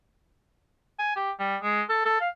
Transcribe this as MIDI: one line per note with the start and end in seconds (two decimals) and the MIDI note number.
0.99 1.14 80
1.16 1.31 67
1.39 1.56 55
1.62 1.82 56
1.89 2.03 69
2.05 2.20 69
2.21 2.29 77